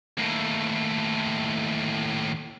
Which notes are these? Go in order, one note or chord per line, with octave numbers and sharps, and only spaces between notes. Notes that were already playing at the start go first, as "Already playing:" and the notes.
D#2 A2